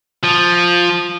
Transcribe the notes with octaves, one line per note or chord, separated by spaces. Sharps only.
F3